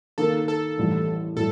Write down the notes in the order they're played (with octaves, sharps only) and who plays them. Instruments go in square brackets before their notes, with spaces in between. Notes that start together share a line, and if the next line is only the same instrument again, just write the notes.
[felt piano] D#3 A#3 D#4 A#4 [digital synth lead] A4
[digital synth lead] A4
[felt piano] A1 A2 G3
[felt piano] A2 G3 [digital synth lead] A4